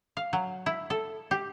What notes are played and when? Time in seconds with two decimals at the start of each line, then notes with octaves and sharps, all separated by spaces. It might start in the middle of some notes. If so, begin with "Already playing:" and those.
0.17 F5
0.33 F#3
0.66 E4
0.90 A4
1.31 G4